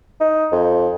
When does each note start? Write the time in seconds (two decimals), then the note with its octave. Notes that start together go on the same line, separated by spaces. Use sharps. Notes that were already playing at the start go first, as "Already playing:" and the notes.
0.20 D#4
0.52 F2